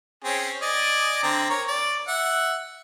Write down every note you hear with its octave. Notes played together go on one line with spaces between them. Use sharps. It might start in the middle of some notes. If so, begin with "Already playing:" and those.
C4 C#4 G#4
D5 D#5 G#5
D3 C4 A#5
A#4 C#5
D5
E5 F#5